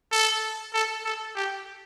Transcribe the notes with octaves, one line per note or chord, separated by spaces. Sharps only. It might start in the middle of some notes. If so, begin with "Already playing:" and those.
A4
A4
A4
G4